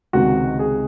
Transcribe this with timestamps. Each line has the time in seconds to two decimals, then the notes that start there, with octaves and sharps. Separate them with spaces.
0.13 C#2 C3 D#3 G#3 F#4
0.59 G#4